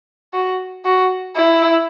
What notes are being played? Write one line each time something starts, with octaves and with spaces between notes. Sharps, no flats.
F#4
F#4
E4